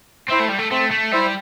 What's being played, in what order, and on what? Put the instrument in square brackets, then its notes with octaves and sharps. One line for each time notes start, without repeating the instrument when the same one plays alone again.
[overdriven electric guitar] C4 [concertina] E4 C5 E5
[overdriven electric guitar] A3
G3
A3
[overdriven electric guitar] A3 [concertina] C4
[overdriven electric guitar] A3
[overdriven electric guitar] G3 [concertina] E4 C5 E5